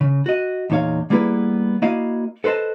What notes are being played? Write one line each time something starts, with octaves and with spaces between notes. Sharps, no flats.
C#3
F#4 D#5
E2 A#2 D#4 C#5 F5
G3 A#3 B3 E4 G#4 B4
A#3 E4 F#4 D5 D#5 F5
A4 B4 C5 D#5 A5